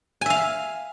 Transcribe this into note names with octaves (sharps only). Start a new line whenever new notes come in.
E5 F5 G#5